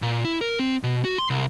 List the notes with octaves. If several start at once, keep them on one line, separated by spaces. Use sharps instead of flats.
A#2
E4
A#4
C4
B2
F#4
C6
C2